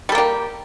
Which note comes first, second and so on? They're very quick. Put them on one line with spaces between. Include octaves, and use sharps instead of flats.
G3 A4 A#3 G4